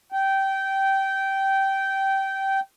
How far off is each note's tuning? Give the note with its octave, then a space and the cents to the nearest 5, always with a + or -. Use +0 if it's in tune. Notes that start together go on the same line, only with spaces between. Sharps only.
G5 -15